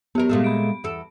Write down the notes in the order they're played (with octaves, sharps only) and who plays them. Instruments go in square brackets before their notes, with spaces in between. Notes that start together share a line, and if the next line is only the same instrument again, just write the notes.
[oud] F#3 A#4 [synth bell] B3 G4
[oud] A#2 G#3 A3
[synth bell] B5 D7
[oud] E2 A4